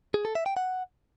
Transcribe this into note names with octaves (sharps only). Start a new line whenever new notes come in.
G#4
A4
E5
G5
F#5